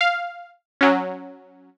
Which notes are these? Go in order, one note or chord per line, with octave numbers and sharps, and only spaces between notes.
F5
F#3 C#4